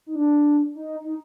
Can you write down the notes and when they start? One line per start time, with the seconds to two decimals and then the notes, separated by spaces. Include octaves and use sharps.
0.06 D#4
0.15 D4
0.75 D#4
1.04 D#4